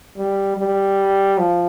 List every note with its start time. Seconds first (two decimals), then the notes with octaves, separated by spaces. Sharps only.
0.17 G3
0.57 G3
1.38 F3